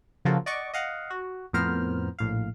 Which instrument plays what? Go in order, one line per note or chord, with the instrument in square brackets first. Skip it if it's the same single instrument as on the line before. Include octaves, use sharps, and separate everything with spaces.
[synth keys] C#3 F3 A#3 F4 F#4 A4
D5 D#5 F#5 C#6 D6
D#5 F5 F#5
F#4
F2 A2 B3 A#4 C5 F6
A#1 A2 F5